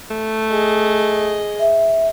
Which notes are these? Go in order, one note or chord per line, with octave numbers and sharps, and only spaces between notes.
A3
G#4 D#5
E5